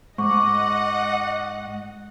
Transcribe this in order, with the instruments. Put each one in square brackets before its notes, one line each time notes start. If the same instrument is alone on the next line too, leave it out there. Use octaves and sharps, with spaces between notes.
[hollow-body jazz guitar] G#2 [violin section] D#5 F#5 [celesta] C#6 D6